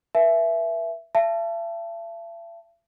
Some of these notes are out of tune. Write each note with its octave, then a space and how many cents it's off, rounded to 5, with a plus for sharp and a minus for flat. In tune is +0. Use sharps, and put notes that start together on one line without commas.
B4 -40 E5 +15 G#5 +40
E5 +40 A5 +0